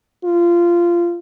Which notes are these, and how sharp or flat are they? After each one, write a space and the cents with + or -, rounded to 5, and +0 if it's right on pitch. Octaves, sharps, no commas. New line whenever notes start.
F4 -20